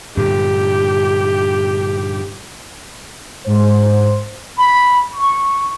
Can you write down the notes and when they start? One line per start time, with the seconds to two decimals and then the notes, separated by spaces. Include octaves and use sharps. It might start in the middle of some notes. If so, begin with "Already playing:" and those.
0.17 G2 A#2 D3 G4
3.46 G#2 C5
4.58 B5
5.13 C#6